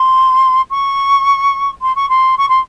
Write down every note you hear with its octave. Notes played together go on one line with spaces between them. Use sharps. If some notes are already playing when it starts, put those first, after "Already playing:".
Already playing: C6
C#6
C6
C#6
C6
C#6
C6